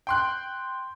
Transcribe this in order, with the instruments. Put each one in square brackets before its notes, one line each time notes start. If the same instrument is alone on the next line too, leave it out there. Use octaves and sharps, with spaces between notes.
[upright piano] G5 C6 F#6